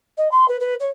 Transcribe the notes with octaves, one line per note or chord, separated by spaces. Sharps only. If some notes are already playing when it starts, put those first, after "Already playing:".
D#5
C6
B4
B4
C#5